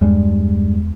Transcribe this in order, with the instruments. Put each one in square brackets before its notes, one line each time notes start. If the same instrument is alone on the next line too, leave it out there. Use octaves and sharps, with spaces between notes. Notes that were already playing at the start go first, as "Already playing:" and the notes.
[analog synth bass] E2 [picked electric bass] G2 G3 [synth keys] G#3